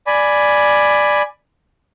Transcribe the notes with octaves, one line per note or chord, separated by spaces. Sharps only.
D5 G#5 B5